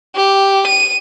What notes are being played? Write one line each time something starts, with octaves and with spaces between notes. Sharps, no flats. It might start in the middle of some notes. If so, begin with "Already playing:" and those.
G4
D#7